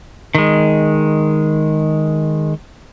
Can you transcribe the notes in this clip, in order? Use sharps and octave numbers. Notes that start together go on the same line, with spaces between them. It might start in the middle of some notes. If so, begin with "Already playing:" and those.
D#3 G#3